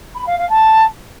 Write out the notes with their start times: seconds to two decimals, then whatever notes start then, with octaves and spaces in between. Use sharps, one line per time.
0.14 B5
0.26 F5
0.38 F5
0.49 A5